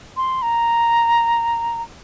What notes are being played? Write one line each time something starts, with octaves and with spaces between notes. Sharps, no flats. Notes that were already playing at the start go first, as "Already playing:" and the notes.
C6
A#5